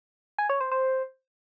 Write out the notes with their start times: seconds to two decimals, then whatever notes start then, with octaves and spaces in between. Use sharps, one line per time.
0.39 G#5
0.50 C#5
0.61 C5
0.72 C5